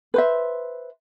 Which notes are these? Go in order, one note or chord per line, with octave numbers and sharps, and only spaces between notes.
B4 C5 E5